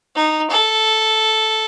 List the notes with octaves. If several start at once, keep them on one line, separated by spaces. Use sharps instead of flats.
D#4
A4